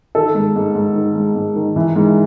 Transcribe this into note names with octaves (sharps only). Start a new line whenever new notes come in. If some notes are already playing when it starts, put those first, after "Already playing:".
D#3 A4
G#2
G#2
G#2
D#3
G#2
G#2
D#3
E3
G#2